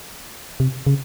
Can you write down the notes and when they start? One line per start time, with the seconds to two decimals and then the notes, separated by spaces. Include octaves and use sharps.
0.60 C3
0.87 C#3